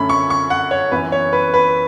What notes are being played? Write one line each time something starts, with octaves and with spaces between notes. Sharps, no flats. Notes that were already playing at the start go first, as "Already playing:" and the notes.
Already playing: F#2 D3 A3 C#4 B5
C#6
C#6
F#5
C#5
F#2 E3 B3 B4
C#5
B4
B4